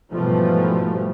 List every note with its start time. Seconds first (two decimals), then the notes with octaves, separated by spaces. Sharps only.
0.12 G#2 B2 E3 F3 G3 A3